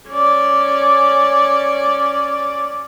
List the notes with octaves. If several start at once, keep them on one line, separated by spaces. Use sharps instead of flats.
C#4 D5